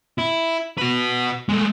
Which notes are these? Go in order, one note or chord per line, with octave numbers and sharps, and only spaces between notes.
E4
F#4 B4
G#3 A3